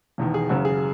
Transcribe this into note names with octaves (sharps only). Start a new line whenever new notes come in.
E1 E2 D#3
G#4
F#1 F#2 C#3 F#4
G#4